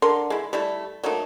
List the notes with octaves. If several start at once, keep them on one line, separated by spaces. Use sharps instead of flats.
D3 A#4 C6
G#3 E4
G3 A3 E4
F#3 A3 A#3 D#4